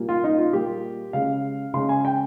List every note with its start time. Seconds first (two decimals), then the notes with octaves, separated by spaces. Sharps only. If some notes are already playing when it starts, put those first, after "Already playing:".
Already playing: A#2 G3 A#3
0.09 F4
0.24 D#4
0.39 F4
0.53 A#2 G3 A#3 G4
1.13 C#3 G#3 F5
1.74 C#3 G#3 C6
1.89 G#5
2.05 G5